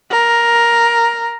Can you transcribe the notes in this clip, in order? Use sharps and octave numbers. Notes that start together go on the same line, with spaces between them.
A#4